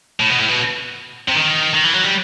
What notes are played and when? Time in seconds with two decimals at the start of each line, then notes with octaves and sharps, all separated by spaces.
0.20 A2
0.30 B2
0.39 A2
0.49 B2
1.28 C3
1.36 D#3
1.75 D#3
1.85 E3
1.94 F#3
2.04 G3